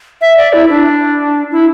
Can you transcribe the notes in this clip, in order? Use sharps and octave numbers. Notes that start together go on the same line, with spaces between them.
E5
D5
E4
D4
E4